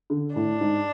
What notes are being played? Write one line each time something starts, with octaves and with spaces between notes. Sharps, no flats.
D3
A2 D4
G#2